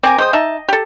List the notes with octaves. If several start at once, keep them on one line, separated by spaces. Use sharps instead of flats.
C4 A#4 G#5 D6
G#3 C5 G5 D#6
D#4 D#5 E5 A5
G4 A4